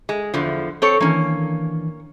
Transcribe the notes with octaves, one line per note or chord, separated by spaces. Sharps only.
G#3
E2 D3 F3
C4 A4 C#5
D#3 E3 A#3 C#4 D4